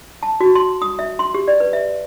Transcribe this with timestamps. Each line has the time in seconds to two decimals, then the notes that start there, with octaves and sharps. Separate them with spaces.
0.23 A5
0.40 F#4
0.55 C6
0.82 D#6
0.99 E5
1.19 C6
1.34 G4
1.48 D5
1.60 B4
1.73 E5